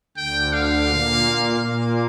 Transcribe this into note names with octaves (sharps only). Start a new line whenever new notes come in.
D2 D3 G5
F5
A#2 A#3
A#2 A#3